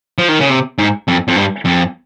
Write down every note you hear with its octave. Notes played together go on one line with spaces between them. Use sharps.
F3
D#3
C#3
C3
G#2
F2
F2
G2
F2